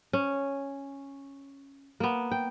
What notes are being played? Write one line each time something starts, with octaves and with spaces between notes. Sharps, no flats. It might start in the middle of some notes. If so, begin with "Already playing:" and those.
C#4
A#3 B3
G5